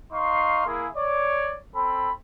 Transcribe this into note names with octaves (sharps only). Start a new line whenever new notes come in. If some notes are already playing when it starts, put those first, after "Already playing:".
D#4 F5 C6 C#6
A#3 E4 G#4
C#5 D5
C4 A4 B5